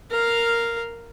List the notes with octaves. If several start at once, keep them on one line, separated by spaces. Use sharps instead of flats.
A#4 F5